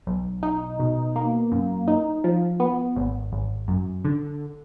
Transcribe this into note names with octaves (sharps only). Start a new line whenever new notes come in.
B1
D#4
B2
A#3
F#2
D#4
F3
B3
G#1
G#1
F#2
D3